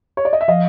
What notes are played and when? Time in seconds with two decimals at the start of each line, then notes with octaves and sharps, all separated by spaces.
0.17 C#5
0.25 D5
0.33 D#5
0.41 E5
0.48 F3 D#5 F5